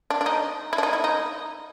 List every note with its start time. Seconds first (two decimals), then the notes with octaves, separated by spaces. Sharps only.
0.10 D4
0.21 D4
0.26 D#4
0.73 E4
0.78 D4
0.83 D#4
0.93 E4
1.04 D#4